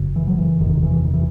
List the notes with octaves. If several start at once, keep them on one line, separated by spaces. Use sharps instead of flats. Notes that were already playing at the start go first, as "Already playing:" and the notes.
Already playing: F#1 F#2 C#3
E3
F#3
E3
F#1 E2 C3 D#3
D#3
E3
D#3
E3